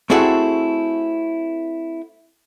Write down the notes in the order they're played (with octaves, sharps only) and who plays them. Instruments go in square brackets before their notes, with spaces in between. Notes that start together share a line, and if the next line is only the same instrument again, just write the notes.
[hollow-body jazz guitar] A3 C4 E4 F#4 G#4 A4